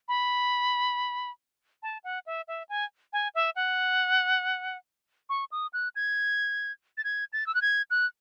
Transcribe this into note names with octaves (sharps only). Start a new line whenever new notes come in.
B5
A5
F#5
E5
E5
G#5
G#5
E5
F#5
C#6
D#6
F#6
G#6
A6
G#6
A6
E6
F#6
G#6
F#6